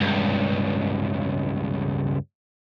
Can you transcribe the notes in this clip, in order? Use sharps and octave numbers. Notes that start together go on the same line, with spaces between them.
C#2 G2